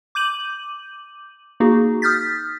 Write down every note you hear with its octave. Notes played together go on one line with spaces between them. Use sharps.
D6 G6 D#7 F#7
A#3 D#4 F#4 G#4
D#6 F6 G6 A6 B6